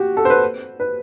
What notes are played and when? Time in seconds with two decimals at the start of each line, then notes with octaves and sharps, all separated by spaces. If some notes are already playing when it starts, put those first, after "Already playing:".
Already playing: F#4 G4
0.17 A4
0.25 C5
0.30 B4
0.80 B4